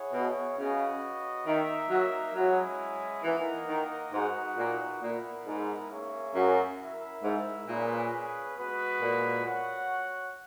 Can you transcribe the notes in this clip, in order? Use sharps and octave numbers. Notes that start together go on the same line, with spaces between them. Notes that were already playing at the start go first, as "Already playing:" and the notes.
Already playing: E4 G#4 C#5 F#5
B2
C#3 C#4 F#4 B4 D#5 F#5
D#3 A#3 D#4 A#4 E5
F#3
F#3 G#3 C#4 E4
E3 A#3 D#4 A#4 D#5 F#5
D#3
G#2 D#4 F#4 B4 F#5
A#2
A#2 B3 E4 A#4
G#2
A#3 C#4 G#4 C#5 E5
F#2
E4 A#4 E5
G#2
A#2 C#4 G#4 B4
G#3 B3 F#4 B4
A#2
F#4 C#5 F#5